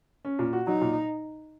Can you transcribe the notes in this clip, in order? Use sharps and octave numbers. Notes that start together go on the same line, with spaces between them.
C#4
A#2
F#4
F#3 D#4
A#2